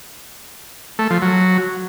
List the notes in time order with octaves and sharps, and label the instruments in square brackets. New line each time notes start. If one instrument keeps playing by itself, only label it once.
[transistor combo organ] A3
F3
F#3